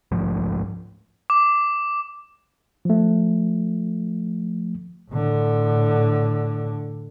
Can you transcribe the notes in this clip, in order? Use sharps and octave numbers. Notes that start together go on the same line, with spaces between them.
G#2 F3 A3
D6
F3 A3
A2 D3